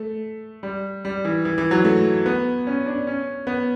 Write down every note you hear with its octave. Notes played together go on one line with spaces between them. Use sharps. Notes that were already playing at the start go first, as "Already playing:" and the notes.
Already playing: A3
G3
G3
E3
E3
E3
F#3
A3
B3
C#4
D4
C#4
B3